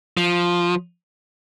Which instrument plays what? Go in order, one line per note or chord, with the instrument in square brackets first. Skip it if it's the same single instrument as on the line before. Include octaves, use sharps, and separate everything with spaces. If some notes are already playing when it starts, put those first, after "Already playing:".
[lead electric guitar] F3